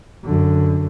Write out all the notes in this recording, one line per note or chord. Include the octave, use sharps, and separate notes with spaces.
F#2 D3